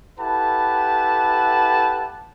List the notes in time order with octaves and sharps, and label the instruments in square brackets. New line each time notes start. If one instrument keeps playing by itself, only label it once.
[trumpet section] E4 G4 A4 B4 F#5 A5